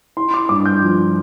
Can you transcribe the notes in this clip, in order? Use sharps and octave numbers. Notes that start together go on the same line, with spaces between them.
E4 C6
D6
G2 D6
G6
F3